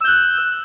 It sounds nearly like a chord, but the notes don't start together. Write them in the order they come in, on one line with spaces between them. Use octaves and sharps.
E6 G6 F#6